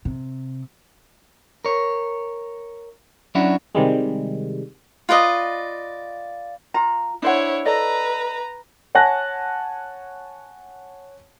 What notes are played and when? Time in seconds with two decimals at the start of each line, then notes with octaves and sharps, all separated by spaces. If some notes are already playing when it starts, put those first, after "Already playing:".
0.05 C3
1.65 A#4 C#5
3.35 F#3 C#4 D4 E4 F#4
3.75 C3 D#3 G3 G#3
5.09 F4 B4 D5 D#5
6.74 F4 A#5
7.22 D4 E4 C5 C#5 F#5
7.65 A4 B4 D5 D#5 A#5
8.95 C#5 F#5 G#5 A5 F#6 A#6